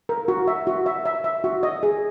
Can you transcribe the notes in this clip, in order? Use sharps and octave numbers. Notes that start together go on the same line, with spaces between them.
A#4
F#4
E5
F#4
E5
E5
E5
F#4
D#5
G#4